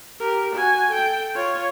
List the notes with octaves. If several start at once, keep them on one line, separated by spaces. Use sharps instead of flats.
G4 A#4
F#4 G#5
A4 G5
F4 C#5